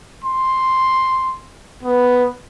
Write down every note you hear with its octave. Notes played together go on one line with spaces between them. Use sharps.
C6
B3